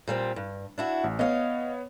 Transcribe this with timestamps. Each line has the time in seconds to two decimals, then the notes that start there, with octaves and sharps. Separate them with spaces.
0.08 A#2 G3 C4
0.36 G2
0.78 D4 E4 F#4
1.04 A1
1.19 B3 C#5 D#5 F5